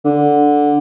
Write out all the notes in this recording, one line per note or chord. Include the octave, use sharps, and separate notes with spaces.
D3